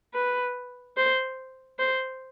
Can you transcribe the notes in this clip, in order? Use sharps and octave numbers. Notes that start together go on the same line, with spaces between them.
B4
C5
C5